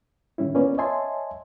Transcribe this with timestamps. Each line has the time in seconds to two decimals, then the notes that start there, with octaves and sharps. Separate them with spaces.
0.38 A2 D3 D#3 G3 C#4 E4
0.55 A#3 B3 C#4 F4 B4 D5
0.78 C#5 D#5 E5 G#5 A5 C6